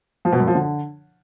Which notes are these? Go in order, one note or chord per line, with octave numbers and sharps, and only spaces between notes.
F3
B2
F#2
F3
D3